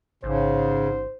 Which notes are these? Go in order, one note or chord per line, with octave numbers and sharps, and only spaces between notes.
A1 G#2 C#3 C5